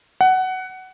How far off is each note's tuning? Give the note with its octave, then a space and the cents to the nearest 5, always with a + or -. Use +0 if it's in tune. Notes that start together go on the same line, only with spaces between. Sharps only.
F#5 +15